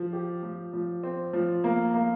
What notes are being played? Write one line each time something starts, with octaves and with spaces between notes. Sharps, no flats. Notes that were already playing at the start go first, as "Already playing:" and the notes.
Already playing: F3
G4
F3
F3
C4
F3
A#3
A#3